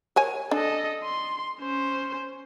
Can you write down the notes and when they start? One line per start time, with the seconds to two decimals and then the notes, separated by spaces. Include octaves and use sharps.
0.16 A#4 C#5 G#5
0.51 D4 A4 D#5
1.03 C6
1.60 C#4 C5